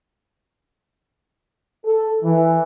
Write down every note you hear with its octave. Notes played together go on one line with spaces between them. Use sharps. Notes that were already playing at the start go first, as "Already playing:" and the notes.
A4
E3